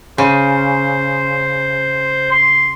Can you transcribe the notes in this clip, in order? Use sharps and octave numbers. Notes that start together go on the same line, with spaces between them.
C#3 C5
C6